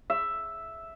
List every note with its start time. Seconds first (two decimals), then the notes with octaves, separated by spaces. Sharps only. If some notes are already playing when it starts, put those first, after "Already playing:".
0.10 E5